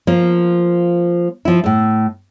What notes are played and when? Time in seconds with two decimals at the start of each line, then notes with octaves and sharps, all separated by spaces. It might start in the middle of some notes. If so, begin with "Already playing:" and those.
0.07 F3 A#3
1.45 F3 E4
1.64 A2 A3